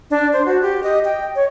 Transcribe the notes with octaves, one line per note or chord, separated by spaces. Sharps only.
D4
C5
F#4
G4
D#5
G5
C#5